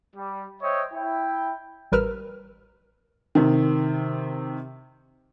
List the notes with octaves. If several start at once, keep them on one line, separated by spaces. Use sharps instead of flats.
G3
C5 C#5 D#5 E5 G5
E4 G5
A1 G3 A#4 B4 E6 F6
C3 D#3